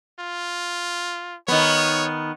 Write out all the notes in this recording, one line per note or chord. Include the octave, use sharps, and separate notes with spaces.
F4
D#3 B3 C#5